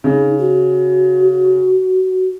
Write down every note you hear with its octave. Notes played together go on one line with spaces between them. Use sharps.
C#3 D#4
F#4